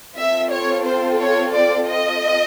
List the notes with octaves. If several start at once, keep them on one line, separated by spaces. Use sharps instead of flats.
C4 F4 A4 E5
C#5
C5
C#5
D5
D#5